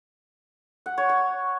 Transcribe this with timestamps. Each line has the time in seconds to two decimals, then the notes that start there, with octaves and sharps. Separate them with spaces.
0.86 F#5
0.98 C#5
1.09 C#5